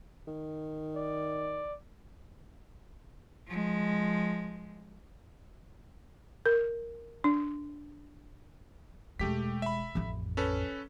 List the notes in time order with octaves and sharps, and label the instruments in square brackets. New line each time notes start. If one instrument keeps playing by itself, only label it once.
[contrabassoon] D#3
[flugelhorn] D5
[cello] F3 G#3
[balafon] A#4
D4
[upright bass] E1 G#3 [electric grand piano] A3 G4 B6
[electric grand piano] E5 B5
[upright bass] A1 F2
[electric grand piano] C#4 A4 B4